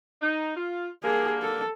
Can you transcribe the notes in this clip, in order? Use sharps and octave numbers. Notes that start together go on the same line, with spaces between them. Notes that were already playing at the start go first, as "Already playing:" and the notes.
D#4
F4
D3 G3 A#3 G#4
A4